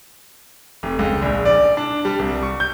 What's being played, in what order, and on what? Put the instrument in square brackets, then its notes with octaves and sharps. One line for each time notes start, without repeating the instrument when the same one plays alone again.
[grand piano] F1
C#2
A#1
D5
D4
G3
C2
C#6
G6